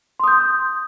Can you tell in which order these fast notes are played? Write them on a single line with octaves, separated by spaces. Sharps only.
C6 D#6 G6